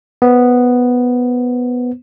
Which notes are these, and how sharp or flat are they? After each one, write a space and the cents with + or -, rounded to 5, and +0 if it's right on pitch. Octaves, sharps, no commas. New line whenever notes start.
B3 +0 C5 +10